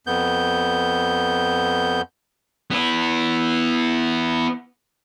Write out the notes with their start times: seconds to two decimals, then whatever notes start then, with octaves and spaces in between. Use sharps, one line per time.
0.07 F2 B3 G6
2.71 B3 E4